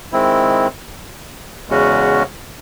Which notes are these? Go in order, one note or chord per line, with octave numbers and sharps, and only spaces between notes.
D#3 G#3 C4 E4
E2 C#3 G#3 C#4 F#4